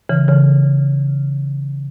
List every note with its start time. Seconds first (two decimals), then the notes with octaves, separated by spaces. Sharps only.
0.09 C#3 E3
0.28 C#3 E3